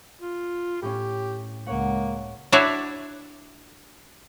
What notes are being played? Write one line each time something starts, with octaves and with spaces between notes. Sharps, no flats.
F4
A2 C#4 G4
C#2 A#3 C#5 F#5
D4 E4 F#4 C#5 D5 E5